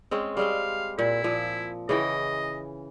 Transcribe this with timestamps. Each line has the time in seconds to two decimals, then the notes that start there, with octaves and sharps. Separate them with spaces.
0.11 G#3 C4 C#4
0.37 G3 G#3 C4 F5
0.99 A#2 E4
1.24 A#2 F3
1.89 C#3 E3 D#5 G5